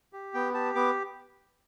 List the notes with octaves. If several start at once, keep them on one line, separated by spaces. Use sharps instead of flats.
G4
B3 G5
G4 A5
B3 D6